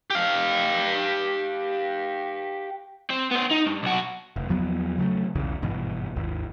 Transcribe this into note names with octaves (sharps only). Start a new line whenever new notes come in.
G4 F5
C4
B3 C5
D#4
G2
B1 F#4
F1
E2 F3 F#3 B3
C#3 F#3 G#3 A3
B1 E2 C#3 E3
G#1 G2 B2 E3
G#1 D#2